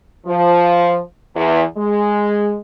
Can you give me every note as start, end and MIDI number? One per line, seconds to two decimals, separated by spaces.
0.26 0.99 53
1.35 1.62 40
1.77 2.57 56